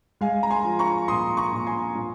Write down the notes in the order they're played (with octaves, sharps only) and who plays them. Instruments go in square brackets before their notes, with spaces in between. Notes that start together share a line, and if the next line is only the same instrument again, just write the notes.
[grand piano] G#3 F5 G#5
A#5
G#5 C6
F3
A#5 C#6
A#2 C6 D#6
A#5 C#6
A#2
G#5 C6
A#2